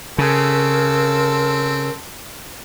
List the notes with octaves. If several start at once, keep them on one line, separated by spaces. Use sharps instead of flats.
C#3 C4 A4 A#4